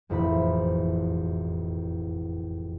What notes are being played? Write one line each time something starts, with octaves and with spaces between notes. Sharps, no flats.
E1 A1 F2 E3 E4 B5